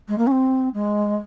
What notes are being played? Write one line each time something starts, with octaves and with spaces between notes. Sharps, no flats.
G#3
A#3
C#4
C4
G#3